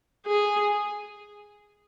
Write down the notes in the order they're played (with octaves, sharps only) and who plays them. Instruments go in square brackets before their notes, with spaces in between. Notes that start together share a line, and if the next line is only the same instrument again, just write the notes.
[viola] G#4